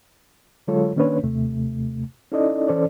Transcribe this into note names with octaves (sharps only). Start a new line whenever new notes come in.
D3 F#3 G#3 F4 A4 C#5
D#3 A#3 C#4 D4 B4 C#5
D#2 C3 A3
C#4 D#4 E4 A4 D5 D#5
E3 C#4 A4 C5 D5